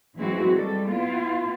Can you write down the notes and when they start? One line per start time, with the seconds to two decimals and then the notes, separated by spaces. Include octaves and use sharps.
0.16 E3 F#3 G#3 C4 E4 F#4
0.55 G3 A4
0.87 B3 E4 F4